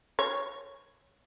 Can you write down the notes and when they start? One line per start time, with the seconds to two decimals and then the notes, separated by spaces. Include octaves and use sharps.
0.19 C#5